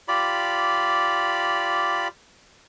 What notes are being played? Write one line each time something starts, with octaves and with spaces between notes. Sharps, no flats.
F4 G4 D5 B5